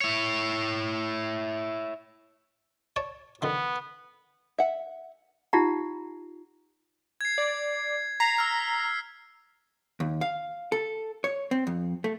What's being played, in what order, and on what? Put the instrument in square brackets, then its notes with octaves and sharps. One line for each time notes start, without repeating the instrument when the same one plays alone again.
[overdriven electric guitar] E4 C#5
[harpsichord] C#5 D5 A5
[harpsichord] D3 D#3 F3 [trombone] B3
[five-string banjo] E5 F#5
[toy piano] D#4 F4 G4 E5 F#5 A#5
[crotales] G#6 C7
[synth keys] D5
[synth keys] A#5 [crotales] B6 C7
[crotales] E6 F6
[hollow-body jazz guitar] D#2
F5
A4
C#5
C4
F2
A3